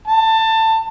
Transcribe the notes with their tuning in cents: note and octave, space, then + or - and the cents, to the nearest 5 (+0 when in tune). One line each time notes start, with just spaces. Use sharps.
A5 +20